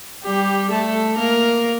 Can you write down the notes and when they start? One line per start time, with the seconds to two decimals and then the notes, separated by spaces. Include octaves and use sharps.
0.24 G3 G4
0.71 A3 A4
1.18 A#3 A#4